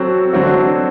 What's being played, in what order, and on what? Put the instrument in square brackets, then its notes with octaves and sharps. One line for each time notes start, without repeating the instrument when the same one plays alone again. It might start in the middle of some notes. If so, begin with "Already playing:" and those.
Already playing: [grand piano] F#3 C4 F#4 A4
D3 F#3 C4 F#4